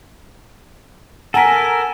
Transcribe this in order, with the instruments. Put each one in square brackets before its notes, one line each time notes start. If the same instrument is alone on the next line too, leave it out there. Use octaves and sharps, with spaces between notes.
[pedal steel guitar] A4 A#4 [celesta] F#5 A#5 B6 [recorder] G#5